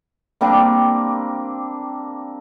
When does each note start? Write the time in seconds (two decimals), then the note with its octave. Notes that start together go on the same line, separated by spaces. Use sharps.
0.41 G3 A#3 C4 D4